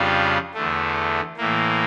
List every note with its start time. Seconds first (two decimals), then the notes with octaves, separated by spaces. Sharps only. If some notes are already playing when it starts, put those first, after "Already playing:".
Already playing: F2 C#3 G3 D4 F4
0.54 E2 D3 A3
1.37 A2 E3 A#3